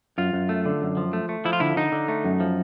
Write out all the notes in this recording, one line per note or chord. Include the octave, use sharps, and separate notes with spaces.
F#2 F4
F#2
A3
D3
F#2
F3
A3
A3
F3 E4
F4
D3 E4
D3 D#4
D3
A3
F#2
F3